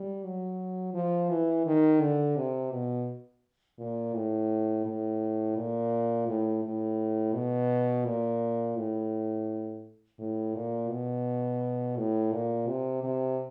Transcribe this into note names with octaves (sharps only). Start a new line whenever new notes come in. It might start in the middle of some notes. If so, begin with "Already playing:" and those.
Already playing: G3
F#3
F3
E3
D#3
D3
C3
B2
A#2
A2
A2
A#2
A2
A2
B2
A#2
A2
A2
A#2
B2
A2
A#2
C3
C3